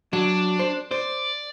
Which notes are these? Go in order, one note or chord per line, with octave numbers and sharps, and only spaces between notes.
F#3 D4
C5
C5 D5